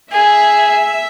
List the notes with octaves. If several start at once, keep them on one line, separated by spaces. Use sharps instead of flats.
G#4 E5